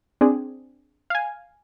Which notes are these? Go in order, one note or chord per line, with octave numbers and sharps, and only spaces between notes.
C4 D4 G#4
F5 G#5